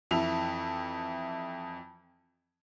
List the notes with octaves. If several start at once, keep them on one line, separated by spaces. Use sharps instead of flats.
F2 E3 E5 F7